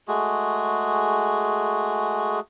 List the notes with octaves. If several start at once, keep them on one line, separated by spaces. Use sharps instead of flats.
G#3 A3 F#4 G#4